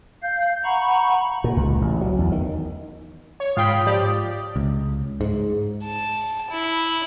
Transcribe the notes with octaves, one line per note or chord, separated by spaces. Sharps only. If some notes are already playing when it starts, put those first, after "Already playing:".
F5 G6
F#5 A#5 B5 C#6
A#2
C#2
A1
F#3
E2
D#3
C#5
G#2 F4 G5 B5 D#6
F3 G4 D5
C#2
G#2
A5
E4